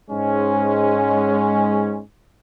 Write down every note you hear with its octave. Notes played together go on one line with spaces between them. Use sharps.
G#2 G#3 C#4